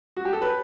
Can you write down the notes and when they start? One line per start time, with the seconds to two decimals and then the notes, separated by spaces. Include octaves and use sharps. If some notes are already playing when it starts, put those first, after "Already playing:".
0.17 F#4
0.25 G4
0.33 A4
0.42 B4